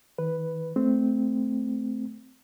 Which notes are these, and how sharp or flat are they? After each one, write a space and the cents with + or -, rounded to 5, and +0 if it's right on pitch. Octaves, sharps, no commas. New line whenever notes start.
D#3 +40 B4 +0
A3 -10 C4 -10